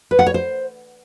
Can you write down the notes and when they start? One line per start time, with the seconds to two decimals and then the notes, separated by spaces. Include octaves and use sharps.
0.11 B4
0.19 F#5
0.26 C#5
0.34 C5